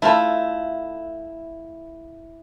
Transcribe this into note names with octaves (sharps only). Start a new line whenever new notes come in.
A3 E4 F4 A4